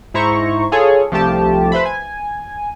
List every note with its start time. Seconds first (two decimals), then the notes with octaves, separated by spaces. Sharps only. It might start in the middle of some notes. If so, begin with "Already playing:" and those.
0.14 G#2 E4 C5 A#5 C#6
0.72 F4 G#4 A4 C#5
1.11 C2 F3 A3 G4 A5
1.72 B4 C5 E5 B5
1.85 G#5